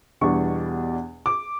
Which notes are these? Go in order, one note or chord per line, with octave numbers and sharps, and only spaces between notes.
E2 B2 G3 B3 D4 C#6
D6